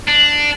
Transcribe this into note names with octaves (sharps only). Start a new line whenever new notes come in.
D4